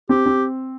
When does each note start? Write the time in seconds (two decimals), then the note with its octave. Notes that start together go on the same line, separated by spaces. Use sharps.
0.09 C4 G4
0.26 C4